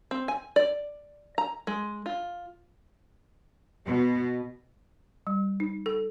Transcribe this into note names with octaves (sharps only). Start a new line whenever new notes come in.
C4
G#5
D5
A#5
G#3
F4
B2
G3
D#4
A4